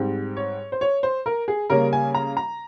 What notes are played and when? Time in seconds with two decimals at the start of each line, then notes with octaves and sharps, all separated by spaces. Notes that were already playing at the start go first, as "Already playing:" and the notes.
Already playing: G#2 G3 C4
0.37 C#5
0.72 C5
0.81 C#5
1.03 C5
1.26 A#4
1.48 G#4
1.70 C#3 G3 A#3 C#4 A#4
1.93 G#5
2.15 A#5
2.37 A#5